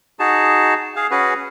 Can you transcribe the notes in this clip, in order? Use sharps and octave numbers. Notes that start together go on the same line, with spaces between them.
D#4 F#4 G#4 A5
G#4 F5
C#4 F#4 G#4 B4